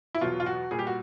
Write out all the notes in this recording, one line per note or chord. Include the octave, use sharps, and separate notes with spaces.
E4
E2 B2 F#3 F4
F4
F#4
A#2 G3 G#4
G4
F#4